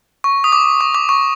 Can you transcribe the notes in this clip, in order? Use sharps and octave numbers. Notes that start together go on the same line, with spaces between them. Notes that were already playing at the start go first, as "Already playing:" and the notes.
C#6
D#6
D6
C#6
D6
C#6